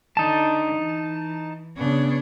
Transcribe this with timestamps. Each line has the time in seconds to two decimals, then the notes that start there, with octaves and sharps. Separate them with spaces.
0.17 D3 D#4 A5
0.76 E3
1.77 C#3 B3 D4 C#5